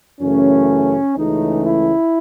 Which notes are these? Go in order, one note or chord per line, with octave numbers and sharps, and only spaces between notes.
F#2 C#3 E3 A3 C#4
C#2 C#3 E3 A3 D#4
E4